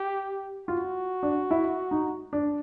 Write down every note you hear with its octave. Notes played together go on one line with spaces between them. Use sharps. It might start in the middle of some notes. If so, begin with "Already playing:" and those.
Already playing: G4
F4 F#4
D4
E4
D#4
D4